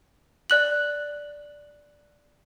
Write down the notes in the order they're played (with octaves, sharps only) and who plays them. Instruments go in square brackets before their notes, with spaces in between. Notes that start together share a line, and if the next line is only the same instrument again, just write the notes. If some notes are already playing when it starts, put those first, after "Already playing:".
[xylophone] D5 F#6 F#7